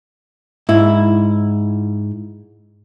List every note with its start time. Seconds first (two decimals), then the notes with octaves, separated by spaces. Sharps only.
0.69 G#2 E4